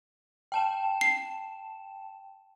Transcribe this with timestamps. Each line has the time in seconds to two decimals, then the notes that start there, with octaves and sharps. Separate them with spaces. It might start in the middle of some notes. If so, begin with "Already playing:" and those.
0.52 G5 A5 E7
1.01 C7